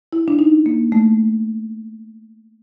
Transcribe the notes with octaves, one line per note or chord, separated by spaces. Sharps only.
E4
D4
D#4
A#3
A3